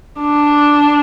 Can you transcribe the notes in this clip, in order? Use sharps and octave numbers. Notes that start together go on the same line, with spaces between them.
D4